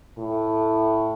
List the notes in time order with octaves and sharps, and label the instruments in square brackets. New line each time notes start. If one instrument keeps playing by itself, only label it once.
[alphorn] A2